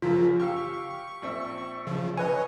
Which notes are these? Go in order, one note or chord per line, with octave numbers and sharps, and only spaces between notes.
F#2 C#3 F3 F4 A#4 B6
G4 F5 C#6 E6
A#1 C4 E5
C#3 F3
B4 C#5 D#5 G#5